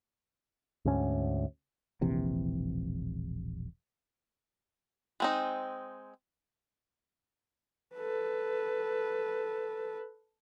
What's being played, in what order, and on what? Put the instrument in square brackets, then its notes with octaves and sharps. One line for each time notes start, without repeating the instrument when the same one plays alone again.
[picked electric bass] D2 G#2 C#4
[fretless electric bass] E1 A#1 C3 E3
[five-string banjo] G#3 C4 D#4
[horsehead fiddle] A4 B4